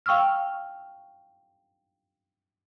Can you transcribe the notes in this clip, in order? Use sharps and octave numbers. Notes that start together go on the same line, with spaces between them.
F5 G5 C#6 E6 F6